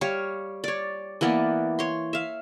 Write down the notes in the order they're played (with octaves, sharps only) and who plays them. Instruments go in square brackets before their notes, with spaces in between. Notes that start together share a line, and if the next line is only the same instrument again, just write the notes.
[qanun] G3 C#5 F5
C#5 D5
E3 A#3 B3 D5
C#5 C6
E5 F5